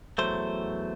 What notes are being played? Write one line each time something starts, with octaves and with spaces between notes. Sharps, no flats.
E2 C#3 F#3 A3 C5